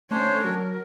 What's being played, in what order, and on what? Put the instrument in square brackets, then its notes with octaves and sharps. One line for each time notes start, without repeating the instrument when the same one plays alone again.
[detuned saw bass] A3 [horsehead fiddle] C#4 C5 [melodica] D4 C#5
[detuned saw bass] F#3 [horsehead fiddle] A#4